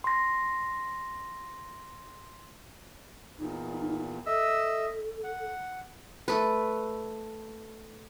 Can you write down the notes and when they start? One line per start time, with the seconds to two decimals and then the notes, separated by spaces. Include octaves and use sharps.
0.04 C6 A#6
3.39 E2 A#2 D#4
4.26 A4 D#5 E5 E6
5.24 F#5
6.28 A3 B4